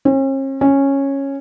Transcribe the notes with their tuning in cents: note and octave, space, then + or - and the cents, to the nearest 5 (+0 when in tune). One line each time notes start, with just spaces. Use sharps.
C#4 -45
C#4 -10